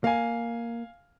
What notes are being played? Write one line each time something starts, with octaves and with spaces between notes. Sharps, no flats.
A#3 F5 G#5